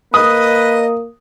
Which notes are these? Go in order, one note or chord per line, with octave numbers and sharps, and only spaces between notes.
A#3 B4 D#5 D#6